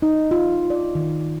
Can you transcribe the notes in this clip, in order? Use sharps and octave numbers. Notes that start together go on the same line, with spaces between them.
D#4
F4
D5
D#3